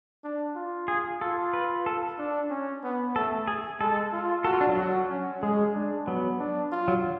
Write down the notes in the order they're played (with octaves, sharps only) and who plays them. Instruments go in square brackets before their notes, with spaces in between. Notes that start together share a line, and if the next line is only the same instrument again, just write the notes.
[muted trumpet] D4
F4
[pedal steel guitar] G#4
[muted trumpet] F4 [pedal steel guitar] A4
[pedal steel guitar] B4
A4
[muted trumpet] D4
C#4
B3
[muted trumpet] A3 [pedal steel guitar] A4
[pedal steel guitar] G#4
[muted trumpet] G#3 [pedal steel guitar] A4
[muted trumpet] F4
[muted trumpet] F#4 [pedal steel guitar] A4
[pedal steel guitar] F4
D4
F#3
[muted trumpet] F#4
C#4
[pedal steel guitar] G#3 [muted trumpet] G#4
[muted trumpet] D4
[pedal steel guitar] F#3 [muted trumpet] B3
[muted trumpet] D4
F4
[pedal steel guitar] F#3